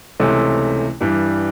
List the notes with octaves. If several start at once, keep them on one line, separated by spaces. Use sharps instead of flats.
C#2 C3 E3 A3 C#4
G2 E3 G3